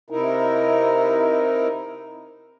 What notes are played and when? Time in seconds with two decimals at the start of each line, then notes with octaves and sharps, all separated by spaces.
0.10 C3 D#4 E4 A#4